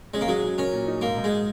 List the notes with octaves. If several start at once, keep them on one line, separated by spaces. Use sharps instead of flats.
G#3 C#4
A#3
F#3 G#3
F#3
C#4 A#4
A#2
D#4
G#2 A#3
G#2
G#3